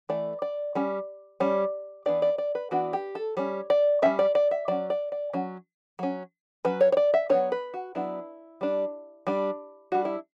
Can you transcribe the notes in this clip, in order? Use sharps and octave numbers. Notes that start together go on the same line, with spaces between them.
E3 A3 D5
D5
G3 C#4
G3 C#4
E3 B3 D4 D5
D5
D5
B4
E3 B3 D4 F#4
G4
A4
G3 C#4 C#5
D5
G3 C#4 E5
D5
D5
E5
F#3 C#4 D5
D5
D5
F#3 C#4
F#3 C#4
F#3 C#4 B4
C#5
C#5
D5
E5
F#3 B3 D4 C#5
B4
F#4
F#3 B3 D4 E4
G3 D4
G3 D4
G3 D4 F#4
E4